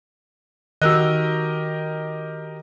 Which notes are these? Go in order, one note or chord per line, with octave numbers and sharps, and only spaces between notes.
D#3 F#4 G4 A#4 D#5 E6 F#6